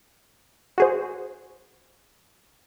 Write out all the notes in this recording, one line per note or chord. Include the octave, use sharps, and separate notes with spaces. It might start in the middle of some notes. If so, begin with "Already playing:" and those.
F#4 G#4 C5